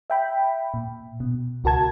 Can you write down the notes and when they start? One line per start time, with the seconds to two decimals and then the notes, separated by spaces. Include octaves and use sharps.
0.10 E5 G5 B5
0.74 A#2
1.20 B2
1.64 C#2 F#4 A#4 A5 G#6